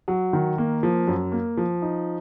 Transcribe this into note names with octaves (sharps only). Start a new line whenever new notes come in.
F#3
D#3
A#3
F3
F#2
A#3
F3
D#4